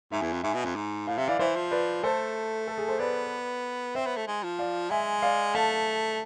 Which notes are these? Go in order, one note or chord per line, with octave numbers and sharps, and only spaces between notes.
G#2 E5 G#5
E2
F2
G#2 E5 G#5
B2
F2
G#2
A2 F5
C3 E5
E3 D5 F5
E3 C5 E5
F3
B4 D5
A3 A4 C5
A4
G#4
A4 C5
B3 B4 D5
C4 C5 E5
B3
A3
G#3
F3
D5 F5
G#3 E5 G#5
D5 F5
A3 F5 A5